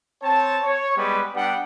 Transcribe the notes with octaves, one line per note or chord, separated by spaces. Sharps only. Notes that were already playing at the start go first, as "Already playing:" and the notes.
C4 C#5 A5
C#5
G3 G#3 B3 B4 D5
G3 B3 D4 F#5 G5